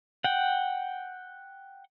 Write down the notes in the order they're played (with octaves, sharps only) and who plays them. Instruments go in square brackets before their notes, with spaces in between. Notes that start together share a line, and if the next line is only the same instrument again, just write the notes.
[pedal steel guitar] F#5 G5